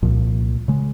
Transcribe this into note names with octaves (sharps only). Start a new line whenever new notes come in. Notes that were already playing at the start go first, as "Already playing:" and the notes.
C2 A#2 F3
C#3 G#3